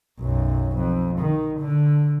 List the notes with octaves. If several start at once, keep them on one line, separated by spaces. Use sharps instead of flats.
B1 F#2
F2
D#3
D3